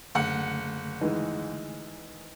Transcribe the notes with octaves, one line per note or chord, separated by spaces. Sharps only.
F#1 D3 A3 F#5
D#3 E3 G#3